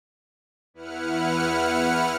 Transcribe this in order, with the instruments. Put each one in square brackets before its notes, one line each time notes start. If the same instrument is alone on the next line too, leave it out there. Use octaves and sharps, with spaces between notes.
[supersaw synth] E2 E4 B4 F#5 F6 C#7